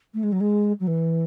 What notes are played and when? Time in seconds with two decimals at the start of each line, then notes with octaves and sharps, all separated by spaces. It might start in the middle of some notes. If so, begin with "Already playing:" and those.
0.14 A3
0.23 G#3
0.32 F#3
0.40 G#3
0.80 F#3
0.87 E3